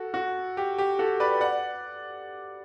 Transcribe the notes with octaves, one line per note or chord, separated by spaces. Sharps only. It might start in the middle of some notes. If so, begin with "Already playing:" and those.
Already playing: F#4 A4
F#4
G4
G4
F#4 A4
B4 D5
D5 F#5